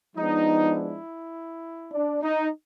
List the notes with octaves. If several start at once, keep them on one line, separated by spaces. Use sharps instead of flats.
F3 G#3 B3 D4 D#4
E4
D4
D#4